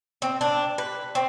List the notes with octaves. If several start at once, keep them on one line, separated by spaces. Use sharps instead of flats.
C4
D4
B4
C4